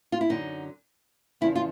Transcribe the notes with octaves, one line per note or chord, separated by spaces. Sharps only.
F4
E4
F#2 D3 F#3 D#4
E2 C#3 F3 E4
F4